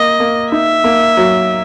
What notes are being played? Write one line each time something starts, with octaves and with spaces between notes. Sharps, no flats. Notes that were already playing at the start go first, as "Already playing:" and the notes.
Already playing: A#3 D#5
A#3
D#4 E5
A#3
F#3